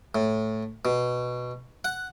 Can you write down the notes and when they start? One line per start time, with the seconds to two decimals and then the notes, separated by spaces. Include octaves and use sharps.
0.15 A2
0.85 B2
1.85 F#5